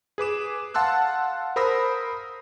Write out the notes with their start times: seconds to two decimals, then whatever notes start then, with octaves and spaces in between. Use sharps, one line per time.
0.18 G#4 B4 D6 E7
0.74 F5 F#5 A5 C6 E6 F#6
1.56 A#4 C5 B5 D#6 E6 A#6